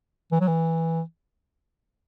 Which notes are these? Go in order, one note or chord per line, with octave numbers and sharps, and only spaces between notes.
E3
F#3
E3